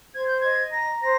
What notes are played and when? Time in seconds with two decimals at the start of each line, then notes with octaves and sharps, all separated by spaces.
0.14 C5 G#6
0.27 G6
0.41 D#5 G#6
0.72 A#5 A#6
1.01 C5 A#6